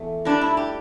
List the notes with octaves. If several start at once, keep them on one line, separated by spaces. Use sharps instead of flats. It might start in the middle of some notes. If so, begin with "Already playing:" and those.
Already playing: E2 A3
A2 G3 D4
E4
G4